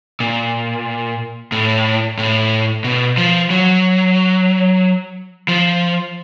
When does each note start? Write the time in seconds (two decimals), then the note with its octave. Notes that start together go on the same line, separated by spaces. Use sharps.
0.20 A#2
1.52 A2
2.19 A2
2.84 B2
3.17 F3
3.50 F#3
5.48 F3